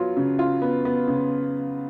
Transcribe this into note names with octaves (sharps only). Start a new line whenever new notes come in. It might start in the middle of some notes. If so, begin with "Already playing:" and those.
Already playing: F#3 B3 F4
C#3
F4
B3
B3
C#3